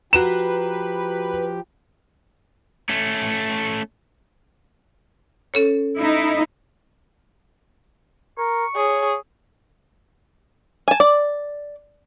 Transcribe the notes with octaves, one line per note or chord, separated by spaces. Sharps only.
F3 F#4 G4 B4 A#5 E7
A3 C#4
C#4 A4 C#5
D#4 E4
A#4 C#6
G#4 C#5
G#5 A5
D5